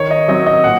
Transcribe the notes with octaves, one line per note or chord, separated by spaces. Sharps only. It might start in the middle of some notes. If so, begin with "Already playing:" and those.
Already playing: D#3 C#5
D#5
F#3 C4 D#5
D#5
A#2 F#5